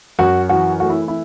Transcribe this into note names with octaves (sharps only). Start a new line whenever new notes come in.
F#2 F#4
E3 F#4
A3 F#4
E4
E4